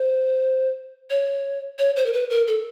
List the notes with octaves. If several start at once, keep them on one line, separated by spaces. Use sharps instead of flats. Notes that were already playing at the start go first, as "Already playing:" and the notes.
Already playing: C5
C#5
C#5
C5
A#4
B4
A#4
A4